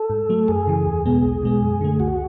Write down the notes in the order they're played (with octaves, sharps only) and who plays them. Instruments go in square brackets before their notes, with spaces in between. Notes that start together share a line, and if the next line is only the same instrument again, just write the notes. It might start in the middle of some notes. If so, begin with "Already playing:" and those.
Already playing: [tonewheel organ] A4
[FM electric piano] G#2
F#3 A3
[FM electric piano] F#2 [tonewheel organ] G#4
[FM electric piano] C#3 E3
E2
B2 G#3 B3
B1
B2 G#3 B3
F#2
D3 A3
[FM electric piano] C#2 [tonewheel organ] F#4